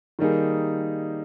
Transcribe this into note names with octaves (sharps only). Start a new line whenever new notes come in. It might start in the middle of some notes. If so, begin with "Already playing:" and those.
D#3 G3 A#3 D#4 G#4